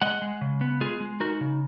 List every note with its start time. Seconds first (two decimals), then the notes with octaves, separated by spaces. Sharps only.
0.02 G#3 D#5 F#5
0.22 G#3
0.41 C#3
0.61 B3
0.81 G#3 F4 G#4
1.01 G#3
1.20 D#4 F#4 A#4
1.41 C#3